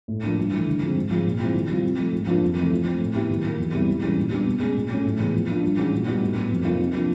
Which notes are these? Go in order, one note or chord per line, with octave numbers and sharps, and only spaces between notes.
A2
F3 A#3 D4
G2
E3 A3
D3
F3 G#3 C4
G#2
F3 G#3
A#2
F3 G#3 C4 E4
D#3
G3 C4 F4
C3
F3 A3
G#2
F3 A#3 D4 F4
F2
C3 E3 A3
F3
A3 C4
A2
F#3 B3 E4 G4
D#3
F#3 A#3
E2
B2 G3 C4 E4
G#2
E3 G3 A#3 C#4
A#2
G3 B3 D4 G4
B2
G#3 C#4
A#2
F#3 A3 C#4
A2
E3 G#3 B3
F3
A#3 D4 F4
G2
E3 G#3 C#4 F#4
A#2
G3 B3 D#4 F#4
A2
F#3 B3
F2
C3 F3 A#3 D#4
C3
F3 A#3 D4 F4